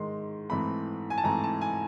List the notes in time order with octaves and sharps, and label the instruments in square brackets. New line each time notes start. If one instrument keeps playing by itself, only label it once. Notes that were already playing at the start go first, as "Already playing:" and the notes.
Already playing: [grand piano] G#2 D#3 G#3 C6
G#2 E3 A3 C4 B5
G#5
A5
G#2 E3 A3 C4 A#5
A5
G#5